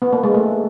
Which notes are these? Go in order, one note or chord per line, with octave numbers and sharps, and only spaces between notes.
B3
A#3
G#3
A3